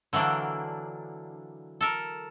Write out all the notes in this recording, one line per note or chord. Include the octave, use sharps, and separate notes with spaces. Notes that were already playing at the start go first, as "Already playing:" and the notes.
D3 E3 F#3 A#3 D4
A4 A#4